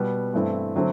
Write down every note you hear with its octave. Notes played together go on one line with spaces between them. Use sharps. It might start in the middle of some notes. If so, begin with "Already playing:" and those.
Already playing: B2 G3 B3
G2 E3 A3 C4 E4
D3 F#3 A3 C4